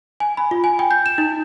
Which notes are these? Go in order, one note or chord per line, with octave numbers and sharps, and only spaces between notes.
G#5
B5
F4
G#5
G5
G6
E7
D#4